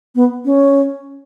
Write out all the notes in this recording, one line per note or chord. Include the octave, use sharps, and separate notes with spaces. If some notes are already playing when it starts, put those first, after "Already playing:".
B3
C#4